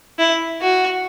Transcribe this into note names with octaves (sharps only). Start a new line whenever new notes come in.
E4
F#4